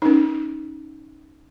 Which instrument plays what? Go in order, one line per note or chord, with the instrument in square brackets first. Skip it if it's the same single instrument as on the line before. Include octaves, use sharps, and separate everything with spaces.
[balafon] C#4 D#4